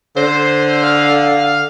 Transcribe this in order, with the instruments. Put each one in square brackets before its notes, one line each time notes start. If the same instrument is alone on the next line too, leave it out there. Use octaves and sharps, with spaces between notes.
[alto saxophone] D3 [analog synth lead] C5
[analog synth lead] F5